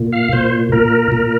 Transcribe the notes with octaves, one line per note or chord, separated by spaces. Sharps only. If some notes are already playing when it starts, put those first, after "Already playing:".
Already playing: A#2
F5
A#2 C5
A#2 A#4
A#2